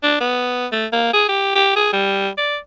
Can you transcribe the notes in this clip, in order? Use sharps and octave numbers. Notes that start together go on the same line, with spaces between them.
D4
B3
A3
A#3
G#4
G4
G4
G#4
G3
D5